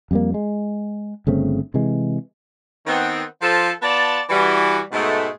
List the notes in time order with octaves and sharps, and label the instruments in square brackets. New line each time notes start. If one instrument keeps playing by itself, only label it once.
[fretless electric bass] F2 G3 A#3
G#3
G1 C#3 A3 C4
C3 E3 G#3
[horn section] D#3 B3 C4
F3 A4 A5
B3 F4 D5 A5
E3 G3 F#4
G#2 B2 G#3 A3